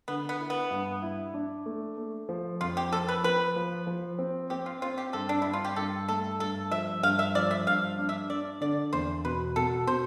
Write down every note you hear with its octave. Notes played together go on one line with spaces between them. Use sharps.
D3 B3
B3
E4
B3
G2
E4
D4
A3
A3
F3
F2 F4
G4
F3 A4
B4
F3 B4
F3
F3
C4
C4 G4
F4
C4 F4
G4
G2 A4
D4
G2 E4
F4
G4
G2 A4
A3 A4
G2 A4
F3 E5
G2 F5
E5
F3 D5
E5
G2 F5
D4
E5
D4 D5
D3 D5
E2 C5
B2 B4
B2 A4
B2 C5